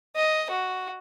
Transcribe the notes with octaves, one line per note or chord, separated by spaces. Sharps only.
D#5
F#4